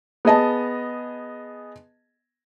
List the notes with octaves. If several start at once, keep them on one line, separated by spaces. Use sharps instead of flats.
B3 G#4 D#5 A5